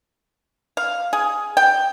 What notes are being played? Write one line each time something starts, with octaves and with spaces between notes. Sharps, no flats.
F5
G#4
G5